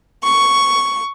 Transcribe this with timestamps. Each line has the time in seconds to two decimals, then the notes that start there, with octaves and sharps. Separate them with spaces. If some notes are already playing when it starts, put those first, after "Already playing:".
0.24 C#6